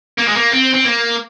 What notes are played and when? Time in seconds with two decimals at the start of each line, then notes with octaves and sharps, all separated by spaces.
0.18 A#3
0.27 G#3
0.36 A#3
0.51 C4
0.73 C4
0.84 A#3